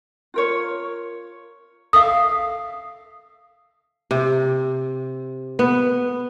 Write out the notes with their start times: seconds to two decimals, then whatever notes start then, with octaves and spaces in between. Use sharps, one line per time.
0.34 F4 A#4 C#5
1.93 A4 E5 F5 D#6
4.11 C3
5.59 B3